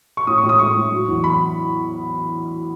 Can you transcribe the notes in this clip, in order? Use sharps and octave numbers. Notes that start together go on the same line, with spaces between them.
C#6
A2 D#6
C#6
A2
D#6
G#3 C#6
A2
F#3
E2
B5